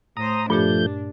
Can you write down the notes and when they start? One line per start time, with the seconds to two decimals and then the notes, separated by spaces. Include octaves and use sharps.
0.17 A2 C5 A#5 D#6
0.50 G2 A#2 F3 A3 D4 G4 G6